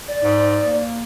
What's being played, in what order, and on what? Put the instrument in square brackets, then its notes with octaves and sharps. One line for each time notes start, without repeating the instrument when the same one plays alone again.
[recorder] D5
[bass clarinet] G#2
A#3